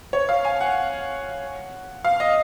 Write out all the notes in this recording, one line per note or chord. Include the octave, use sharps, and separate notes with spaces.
C#5
F5
G#5
F#5
F5
D#5